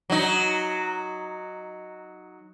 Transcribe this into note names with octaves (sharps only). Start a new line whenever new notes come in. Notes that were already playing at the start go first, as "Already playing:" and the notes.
F#3 D#4